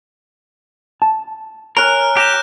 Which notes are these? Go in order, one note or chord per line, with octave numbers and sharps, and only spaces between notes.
A5
A#4 C#5 G#5 A#5 F6 F#6
G4 G6 A#6 E7